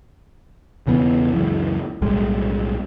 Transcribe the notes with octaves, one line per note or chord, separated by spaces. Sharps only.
E1 C#3 E3 B3
C#2 F#2 E3
B1 A2 G3 G#3